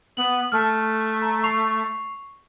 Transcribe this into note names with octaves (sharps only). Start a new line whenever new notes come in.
B3 F#7
A3 A5 F6
A#5
C#6 C7 F7